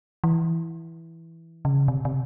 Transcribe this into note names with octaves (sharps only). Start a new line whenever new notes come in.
E3
C#3
C3
C3